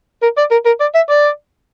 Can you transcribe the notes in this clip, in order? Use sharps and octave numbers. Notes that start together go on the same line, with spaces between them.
A#4
D5
A#4
A#4
D5
E5
D5